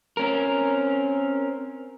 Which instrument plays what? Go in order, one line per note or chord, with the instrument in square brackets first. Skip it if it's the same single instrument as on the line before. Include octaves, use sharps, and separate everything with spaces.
[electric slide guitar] C4 C#4 A#4